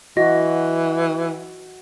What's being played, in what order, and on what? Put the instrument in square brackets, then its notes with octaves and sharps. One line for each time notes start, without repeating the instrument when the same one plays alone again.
[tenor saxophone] E3 [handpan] F#4 [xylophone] D#5